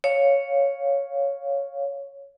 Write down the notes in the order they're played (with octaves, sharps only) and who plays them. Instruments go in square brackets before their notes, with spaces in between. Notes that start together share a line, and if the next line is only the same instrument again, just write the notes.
[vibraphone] C#5 F5